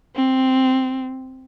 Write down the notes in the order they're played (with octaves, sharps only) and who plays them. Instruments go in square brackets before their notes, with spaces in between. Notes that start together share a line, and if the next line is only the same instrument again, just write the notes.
[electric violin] C4